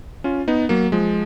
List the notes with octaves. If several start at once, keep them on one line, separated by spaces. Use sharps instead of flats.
C#4 F4
B3 D#4
F#3 A#3
F3 G#3